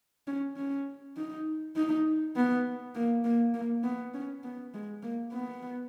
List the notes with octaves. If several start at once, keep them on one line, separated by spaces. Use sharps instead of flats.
C#4
C#4
D#4
D#4
B3
A#3
A#3
A#3
B3
C#4
B3
G#3
A#3
B3